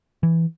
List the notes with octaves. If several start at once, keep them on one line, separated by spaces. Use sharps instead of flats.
E3